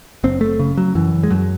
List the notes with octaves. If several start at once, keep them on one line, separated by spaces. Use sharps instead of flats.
F#1 C4
A3
C#3
F#3
F#2 E3
G#3
F#2 F#3